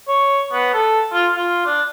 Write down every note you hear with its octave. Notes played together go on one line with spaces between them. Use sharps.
C#5
B3
A4
F4
F4
D4